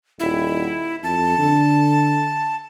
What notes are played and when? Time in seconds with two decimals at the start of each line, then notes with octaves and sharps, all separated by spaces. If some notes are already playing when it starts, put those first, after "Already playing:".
0.19 D#1 E4
1.03 F2 A5
1.38 D3